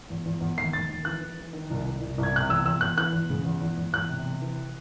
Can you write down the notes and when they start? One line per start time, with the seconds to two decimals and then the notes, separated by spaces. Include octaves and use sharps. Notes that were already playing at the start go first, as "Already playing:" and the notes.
0.10 E2
0.26 E2
0.41 E2
0.58 D#2 C7
0.73 D#2 A6
0.89 D#2
1.05 E3 F#6
1.21 E3
1.37 E3
1.53 D#3
1.70 C2
1.85 C2
2.01 C2
2.18 C2
2.23 G#6
2.33 C3 F#6
2.49 E2 E6
2.66 E2 E6
2.81 E2 F#6
2.98 E3 F#6
3.13 E2
3.30 C#3
3.45 E2
3.62 E2
3.78 E2
3.93 E2 F#6
4.09 C3
4.26 C3
4.42 E3